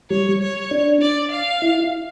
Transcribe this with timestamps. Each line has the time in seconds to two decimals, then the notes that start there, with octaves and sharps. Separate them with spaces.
0.10 G3 C#5
0.41 C#5
0.71 D4
1.01 D5
1.31 F5
1.62 E4